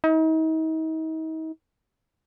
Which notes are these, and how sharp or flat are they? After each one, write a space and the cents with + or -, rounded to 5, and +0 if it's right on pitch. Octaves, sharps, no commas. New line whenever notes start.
D#4 +40